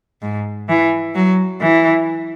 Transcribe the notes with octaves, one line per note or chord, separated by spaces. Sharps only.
G#2
E3
F#3
E3